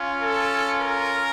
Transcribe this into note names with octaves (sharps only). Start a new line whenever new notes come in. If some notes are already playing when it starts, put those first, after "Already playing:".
Already playing: C#4 F4
A4
A#4